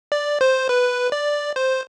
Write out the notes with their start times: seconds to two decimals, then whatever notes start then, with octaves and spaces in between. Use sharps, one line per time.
0.12 D5
0.41 C5
0.69 B4
1.12 D5
1.56 C5